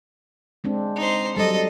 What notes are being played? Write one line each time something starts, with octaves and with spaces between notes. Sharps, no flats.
G#3 C4 D4
D#4 C5
F#3 G3 A4 D#5